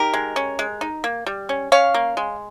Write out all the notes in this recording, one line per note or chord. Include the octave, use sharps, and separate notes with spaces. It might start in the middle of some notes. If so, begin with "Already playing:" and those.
Already playing: D#4 G4 A#4
G#3
C#4
G#3
D#4
A#3
G3
C#4
C#4 C#5 F5
A#3
G#3